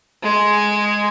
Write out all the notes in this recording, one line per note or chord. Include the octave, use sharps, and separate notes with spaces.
G#3 G#5